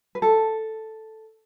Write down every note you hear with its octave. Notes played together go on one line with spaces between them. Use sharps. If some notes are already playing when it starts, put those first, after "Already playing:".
B4
A4